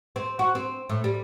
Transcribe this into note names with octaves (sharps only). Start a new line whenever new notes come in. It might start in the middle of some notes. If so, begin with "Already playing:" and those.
C4
F#4
C4
A2
G3